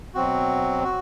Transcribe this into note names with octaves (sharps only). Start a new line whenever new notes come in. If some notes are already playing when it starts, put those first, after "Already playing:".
B2 F#3 C4 F#4
F#4